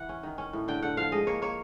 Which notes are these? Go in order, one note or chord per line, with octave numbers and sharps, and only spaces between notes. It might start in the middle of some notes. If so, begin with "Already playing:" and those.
Already playing: E3 F#5
C#4
D#3
C#4
A2
D3 G5
D3 F#5
F3 F5
G#3 D#5
A#3 C#5
A#3 C#5